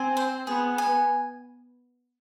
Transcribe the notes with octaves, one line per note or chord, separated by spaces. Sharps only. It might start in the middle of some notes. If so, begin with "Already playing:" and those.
Already playing: C4 G#5
C5
B3 G#4
G#5